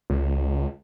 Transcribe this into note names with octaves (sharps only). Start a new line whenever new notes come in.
C#2